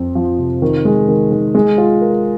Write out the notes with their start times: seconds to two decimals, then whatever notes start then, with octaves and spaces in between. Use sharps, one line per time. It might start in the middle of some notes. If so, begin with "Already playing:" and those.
Already playing: F2 C4
0.15 F3
0.38 C3
0.62 D#3
0.85 G#3
1.08 D#3
1.32 D#3
1.55 G#3
1.78 F4
2.01 A#4